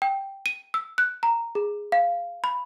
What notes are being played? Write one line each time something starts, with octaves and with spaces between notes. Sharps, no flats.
G5
D#7
E6
F#6
A#5
G#4
F5
B5